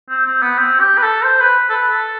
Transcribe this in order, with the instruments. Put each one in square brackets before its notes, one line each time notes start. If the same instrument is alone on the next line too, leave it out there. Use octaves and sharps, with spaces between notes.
[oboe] C4
C4
B3
C4
G4
B4
A4
C5
B4
A4
B4
A4